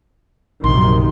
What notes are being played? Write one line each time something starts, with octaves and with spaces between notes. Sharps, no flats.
A#1 F#2 C3 D#3 C6